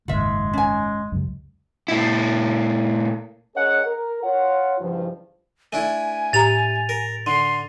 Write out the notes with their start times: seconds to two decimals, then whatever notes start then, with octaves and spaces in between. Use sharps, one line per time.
0.08 F#1 D#2 G#2 G#3 F4 E5
0.53 C#4 G#5
1.12 C#2 F#2
1.88 A#2 E4
3.55 C#4 G#4 A#4 C#5 D#5 F#5
3.86 A#4
4.23 F4 C#5 F#5
4.79 C#2 G2 E3 F3
5.73 A3 D4 E4 G#5
6.33 A2 G4 A#5 A6 F7
6.89 A#4
7.26 D3 C6